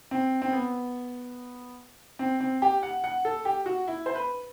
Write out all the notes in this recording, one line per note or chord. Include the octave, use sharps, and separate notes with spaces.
C4
C4
B3
C4
C4
G4
F#5
F#5
A4
G4
F#4
E4
C5
B4